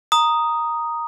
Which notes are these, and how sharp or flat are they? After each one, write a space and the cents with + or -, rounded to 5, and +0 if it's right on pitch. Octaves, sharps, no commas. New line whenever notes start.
A#5 +0 D#6 +0